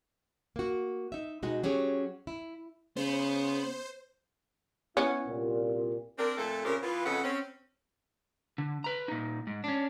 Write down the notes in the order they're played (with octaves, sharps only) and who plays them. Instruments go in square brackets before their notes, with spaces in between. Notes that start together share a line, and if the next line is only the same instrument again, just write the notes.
[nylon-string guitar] A#3 F#4
D#4 E5
B2 G#3 D#4 F#4
F#3 C#4 G4 G#4 C#5
E4
[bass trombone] C#3 [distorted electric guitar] B3 [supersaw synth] C5
[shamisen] B3 C#4 [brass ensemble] E4
[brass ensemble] C2 A#2
[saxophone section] C4 D4 A#4
F2 A#2 A3 A4
A#2 C#3 C4 G4 A#4
E3 B3 F4
F2 C#3 A4 B4 D#5 F#5
C4 C#4
[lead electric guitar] D3
B4 A#5
A#2 D#4
G#2
C#4 D4